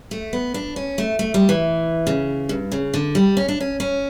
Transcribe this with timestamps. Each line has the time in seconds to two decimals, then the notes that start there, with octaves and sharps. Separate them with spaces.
0.11 A3
0.33 B3
0.54 D4
0.76 C#4
0.98 A3
1.19 A3
1.34 G3
1.49 E3
2.07 C#3
2.49 G2
2.72 C#3
2.94 D3
3.15 G3
3.37 C#4
3.48 D4
3.60 C#4
3.80 C#4